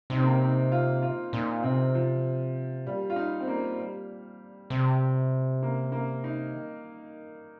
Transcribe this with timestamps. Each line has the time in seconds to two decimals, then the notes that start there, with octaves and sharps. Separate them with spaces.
0.10 C3 D#4
0.18 C4
0.24 A#3
0.33 C4
0.41 D#4
0.72 F4
1.02 F4
1.33 A#2 D#4
1.63 C3 C4
1.95 F3
2.86 A#2 G3
3.10 F4
3.16 D#4
3.40 C4
3.48 A#3
3.77 G3
4.70 C3
5.63 A#3
5.92 A#3
6.24 D#4
6.54 D#3